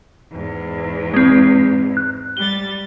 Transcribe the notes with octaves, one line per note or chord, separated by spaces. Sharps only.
E2 G#2
G#3 C4
F#6
G3 A6 G7